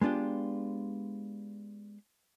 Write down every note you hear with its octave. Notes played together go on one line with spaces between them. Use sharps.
G#3 B3 D4 F4 G4